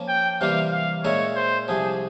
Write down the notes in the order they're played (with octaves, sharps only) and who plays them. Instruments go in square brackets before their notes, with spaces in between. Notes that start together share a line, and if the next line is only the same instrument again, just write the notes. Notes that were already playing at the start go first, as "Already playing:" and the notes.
Already playing: [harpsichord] F3 A#3 C#4
[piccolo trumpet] G5
[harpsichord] C3 E3 G3 A#3 F4 [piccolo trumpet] F5
[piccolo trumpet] F5
[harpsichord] A#2 G#3 C#4 E4 A#4 [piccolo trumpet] C#5
[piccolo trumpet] C5
[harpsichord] C2 C3 F3 [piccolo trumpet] G#4